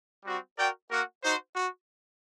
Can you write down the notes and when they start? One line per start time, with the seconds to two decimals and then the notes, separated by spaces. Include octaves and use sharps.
0.25 G3 C4 F#4
0.58 F#4 A#4 D5 G5
0.90 A#3 F#4 A#4 F#5
1.23 D#4 F#4 C5
1.56 F#4